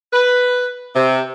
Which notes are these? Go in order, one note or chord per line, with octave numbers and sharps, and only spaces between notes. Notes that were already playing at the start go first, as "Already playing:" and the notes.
B4
C3